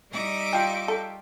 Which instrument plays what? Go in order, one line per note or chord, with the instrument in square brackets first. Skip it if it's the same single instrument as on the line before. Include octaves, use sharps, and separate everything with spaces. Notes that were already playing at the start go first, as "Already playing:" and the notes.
[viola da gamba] G3 D#4 [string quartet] E5 C#6 D6
[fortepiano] F4 G5
[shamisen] A4